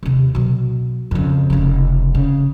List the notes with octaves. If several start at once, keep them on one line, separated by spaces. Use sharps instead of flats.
D#2 C3
B2 F#3
F2 C#3
F1 C#3
C#3